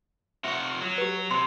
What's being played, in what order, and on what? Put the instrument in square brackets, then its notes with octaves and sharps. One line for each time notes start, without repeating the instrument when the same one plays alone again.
[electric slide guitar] C3 F4 F#5 [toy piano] E5 C#6
[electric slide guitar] F#3
[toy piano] G4 B4
[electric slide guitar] C3 [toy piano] C6